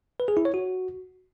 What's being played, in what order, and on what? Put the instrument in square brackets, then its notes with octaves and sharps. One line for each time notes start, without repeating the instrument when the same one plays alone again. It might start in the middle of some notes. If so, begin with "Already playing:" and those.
[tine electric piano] B4
G#4
E4
C#5
F#4